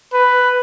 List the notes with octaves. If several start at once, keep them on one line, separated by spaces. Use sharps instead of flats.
B4